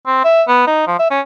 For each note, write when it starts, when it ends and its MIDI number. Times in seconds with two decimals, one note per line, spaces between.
0.07 0.22 60
0.24 0.43 76
0.48 0.66 59
0.67 0.85 63
0.87 0.99 53
0.99 1.07 76
1.11 1.20 61